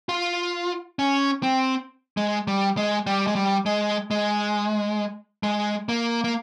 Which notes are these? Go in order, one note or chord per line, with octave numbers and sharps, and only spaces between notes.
F4
C#4
C4
G#3
G3
G#3
G3
G#3
G3
G#3
G#3
G#3
A#3
A#3